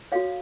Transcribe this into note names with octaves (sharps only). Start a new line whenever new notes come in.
F#4 A4 C#5 F5